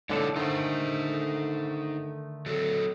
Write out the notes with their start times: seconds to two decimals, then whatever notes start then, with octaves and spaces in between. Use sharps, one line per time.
0.10 G#2 D3 E4 F4 A4 C#5
0.36 D3 D#3 A3 D#4 C5
2.46 F#3 A4